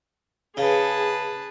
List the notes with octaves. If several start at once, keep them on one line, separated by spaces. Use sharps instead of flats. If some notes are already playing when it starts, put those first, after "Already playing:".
C#3 G#4 B4 A5